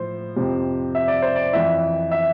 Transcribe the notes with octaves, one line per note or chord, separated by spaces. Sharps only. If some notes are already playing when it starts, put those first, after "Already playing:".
Already playing: A2 F3 C5
F2 C3 F3
E5
D5
C5
D5
F2 E3 E5
E5